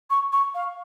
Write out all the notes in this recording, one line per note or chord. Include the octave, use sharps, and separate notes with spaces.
C#6
C#6
F5